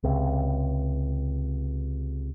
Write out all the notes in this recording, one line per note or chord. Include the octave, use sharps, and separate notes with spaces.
C#2 C3